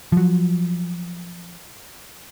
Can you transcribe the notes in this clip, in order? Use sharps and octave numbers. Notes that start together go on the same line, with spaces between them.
F3 F#3